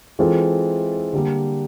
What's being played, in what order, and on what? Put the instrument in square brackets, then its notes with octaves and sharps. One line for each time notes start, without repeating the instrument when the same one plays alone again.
[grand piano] E3 G#3 C4 F4 A4
D3 G3 A#3